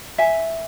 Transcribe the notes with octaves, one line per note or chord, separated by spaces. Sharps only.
E5 G#5